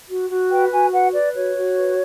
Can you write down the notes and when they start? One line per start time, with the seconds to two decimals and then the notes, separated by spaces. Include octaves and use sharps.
0.08 F#4
0.29 F#4
0.50 B4 G5
0.71 F#4 G#5
0.92 B4 F#5
1.13 B4 D5
1.34 F#4 C#5
1.55 F#4
1.75 B4